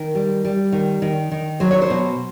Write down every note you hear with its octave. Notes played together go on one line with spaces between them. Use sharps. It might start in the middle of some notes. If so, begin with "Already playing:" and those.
Already playing: D#3 A#4
G3
G3
D#3
D#3
D#3
F#3 C5
C#5
C5
B2